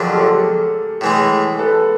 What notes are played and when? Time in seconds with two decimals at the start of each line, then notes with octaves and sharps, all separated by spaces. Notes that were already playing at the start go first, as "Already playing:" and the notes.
Already playing: F2 D3 F#3 G#4 A#4
0.15 G4 A4
1.01 A2 E3 G#3
1.59 A4 B4